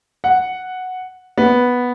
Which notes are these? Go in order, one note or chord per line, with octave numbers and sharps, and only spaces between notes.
F#5
B3